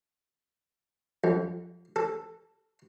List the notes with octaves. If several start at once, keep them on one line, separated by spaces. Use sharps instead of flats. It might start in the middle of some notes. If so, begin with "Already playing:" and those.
F2
A4